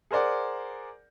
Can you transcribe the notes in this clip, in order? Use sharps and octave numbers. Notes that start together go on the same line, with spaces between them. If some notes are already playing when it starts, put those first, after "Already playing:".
G#4 A#4 C5 D5 F#5